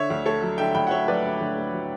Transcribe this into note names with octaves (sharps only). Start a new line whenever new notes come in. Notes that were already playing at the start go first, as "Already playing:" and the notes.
Already playing: D3 C#5 E5
D2
A3 A4 C#5
F#3
D3 E5 G5
D2 G5 B5
F#5
A3 C#5 E5
F#3 B4 D5
D3
D2
A3
F#3